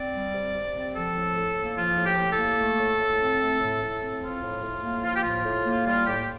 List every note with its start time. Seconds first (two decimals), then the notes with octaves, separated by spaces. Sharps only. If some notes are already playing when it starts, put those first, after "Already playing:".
Already playing: C4 D5
0.13 G3
0.34 C3
0.55 C3
0.74 C4
0.95 F3 A4
1.15 A2
1.36 A2
1.57 A#3
1.77 F3 F4
1.97 A2
2.05 G4
2.18 A2
2.31 A4
2.39 A#3
2.59 A3
2.79 A2
3.00 A2
3.20 C4
3.41 A3
3.61 A2
3.82 A2
4.02 C4
4.22 F3 F4
4.43 A2
4.63 A2
4.84 A#3
5.04 F3 F4
5.14 G4
5.23 A2 F4
5.45 A2
5.66 A#3
5.86 G3 F4
6.07 A2 G4